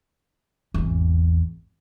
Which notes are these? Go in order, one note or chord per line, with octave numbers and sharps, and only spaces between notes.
G#1 E2